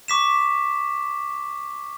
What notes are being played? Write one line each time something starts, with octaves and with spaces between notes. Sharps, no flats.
C#6 D6 B6 E7